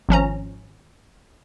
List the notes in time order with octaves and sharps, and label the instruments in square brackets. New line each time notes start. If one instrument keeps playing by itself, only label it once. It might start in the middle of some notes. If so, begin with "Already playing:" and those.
[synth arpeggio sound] G#1 F3 C#4 A#5